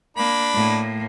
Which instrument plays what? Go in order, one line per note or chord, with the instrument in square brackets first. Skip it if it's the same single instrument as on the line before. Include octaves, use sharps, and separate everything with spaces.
[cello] A#3 [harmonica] D4 B5
[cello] A2 A#3